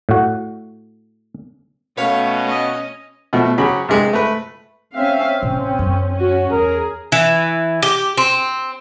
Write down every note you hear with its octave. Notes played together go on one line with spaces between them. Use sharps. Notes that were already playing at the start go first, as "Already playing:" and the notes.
A2 F#4
B2 A3 C#4 B4 C#5 F5
D#5
B2 F3 A3
C#3 F#3 G4 B5
G2 C3 G#3
A3 B4
C4 C#4 E5 F5
A1 C3 C#4
F#2 C#3
C#4 F#4
E2 G#4 A#4
E3
G4
C4